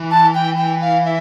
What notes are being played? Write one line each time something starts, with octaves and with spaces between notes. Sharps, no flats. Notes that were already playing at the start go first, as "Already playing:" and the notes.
Already playing: E3
A5
G5
G5
F5
E5